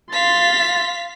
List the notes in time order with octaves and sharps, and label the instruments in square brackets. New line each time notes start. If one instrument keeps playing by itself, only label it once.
[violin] F5 B6 [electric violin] C6 A6